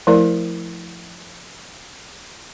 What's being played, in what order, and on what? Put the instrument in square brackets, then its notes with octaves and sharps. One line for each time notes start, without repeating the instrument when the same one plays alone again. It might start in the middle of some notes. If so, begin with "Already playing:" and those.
[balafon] F3 A3 E4 A#4 D5